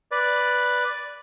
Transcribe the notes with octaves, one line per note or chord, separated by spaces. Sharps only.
B4 D5